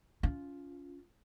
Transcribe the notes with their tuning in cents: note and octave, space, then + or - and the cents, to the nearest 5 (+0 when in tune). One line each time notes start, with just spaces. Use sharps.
C#4 +30 F4 +0